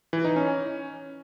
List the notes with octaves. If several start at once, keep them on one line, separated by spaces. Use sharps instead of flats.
E3
D#4
C#4